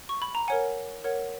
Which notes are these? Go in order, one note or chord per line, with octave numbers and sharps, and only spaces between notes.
C#6
B5
A#5
A#4 C#5 F#5 G#5
A#4 C#5 F#5